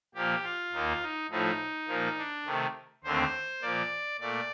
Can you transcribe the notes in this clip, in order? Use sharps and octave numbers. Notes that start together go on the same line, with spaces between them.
A#2 F3 A#3 G4
F4
D#2 D#3 A#3
D#4
A2 F3 A3 D#4
A#2 F3 A#3
D4
C3 D#3 A3
D#2 D3 A3 C4 C5
A#2 F3 A#3 D5
A#2 A3 D5